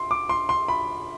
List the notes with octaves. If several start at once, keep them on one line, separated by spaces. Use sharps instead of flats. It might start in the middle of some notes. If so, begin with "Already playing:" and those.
Already playing: C6
D6
C6
C6
B5